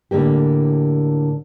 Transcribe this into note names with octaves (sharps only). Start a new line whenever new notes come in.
A2 D3 G3 A#3 G4